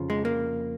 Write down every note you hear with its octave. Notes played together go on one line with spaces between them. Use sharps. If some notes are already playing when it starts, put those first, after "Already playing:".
Already playing: F2 C#3 F3
G#3
A#3